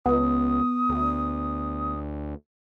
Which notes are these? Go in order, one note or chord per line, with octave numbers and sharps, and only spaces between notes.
C#2 B3 D#6
D2